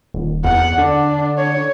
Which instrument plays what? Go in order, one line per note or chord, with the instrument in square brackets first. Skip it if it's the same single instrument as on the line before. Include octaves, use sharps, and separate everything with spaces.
[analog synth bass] D#1
[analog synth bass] E2 [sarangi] F#5
[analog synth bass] D3 [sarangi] D4
[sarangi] C#5